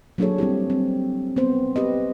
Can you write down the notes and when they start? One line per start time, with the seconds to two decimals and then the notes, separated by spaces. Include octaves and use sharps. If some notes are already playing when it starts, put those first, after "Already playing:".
0.18 F#3 A#3 D4 G#4 A4 C#5
0.38 G3 C4 E4 G4
0.70 C4
1.36 B3 C4 C5
1.76 G4 B4 D#5